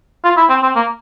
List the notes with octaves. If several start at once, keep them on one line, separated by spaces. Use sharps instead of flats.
F4
E4
C4
C4
A#3